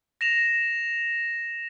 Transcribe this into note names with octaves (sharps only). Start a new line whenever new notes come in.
A#6 E7 F7